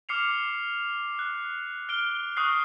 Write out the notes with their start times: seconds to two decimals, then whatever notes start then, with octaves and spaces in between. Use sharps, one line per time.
0.09 D6 F6 C7 C#7 F7
1.19 F#6
1.89 F6 D7 G7
2.37 C#6 D#6 F#6 C7